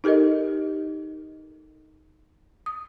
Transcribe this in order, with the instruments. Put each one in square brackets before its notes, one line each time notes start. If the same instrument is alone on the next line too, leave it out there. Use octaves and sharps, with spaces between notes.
[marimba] D#4 G4 A4 A#4 D#5
D#6